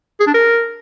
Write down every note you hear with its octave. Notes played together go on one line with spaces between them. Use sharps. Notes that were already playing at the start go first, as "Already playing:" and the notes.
G#4
D4
A#4